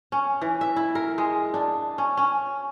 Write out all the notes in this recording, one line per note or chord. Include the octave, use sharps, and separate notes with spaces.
C#4
E3
E5
E4
A#4
G#3
D4
C#4
C#4